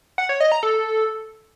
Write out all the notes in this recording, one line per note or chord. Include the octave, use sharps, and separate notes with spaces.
F#5
C#5
D#5
A#5
A4